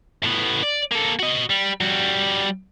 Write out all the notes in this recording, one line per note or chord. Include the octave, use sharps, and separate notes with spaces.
A2 B3
D5
A#3 A4
F#4 D#5
G3
G3 F#4